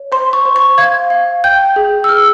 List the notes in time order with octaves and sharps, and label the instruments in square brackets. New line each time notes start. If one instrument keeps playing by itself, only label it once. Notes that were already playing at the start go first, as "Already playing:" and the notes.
Already playing: [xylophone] C#5
C5 C6
C#6
C5
C#6
F5 G#6
F5
G5 G6
G#4
E6
G#4 F6